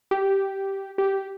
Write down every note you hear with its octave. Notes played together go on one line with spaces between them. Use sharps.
G4
G4